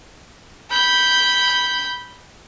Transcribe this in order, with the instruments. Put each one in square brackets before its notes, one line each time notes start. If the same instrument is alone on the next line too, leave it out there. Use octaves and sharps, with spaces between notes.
[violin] B5 G6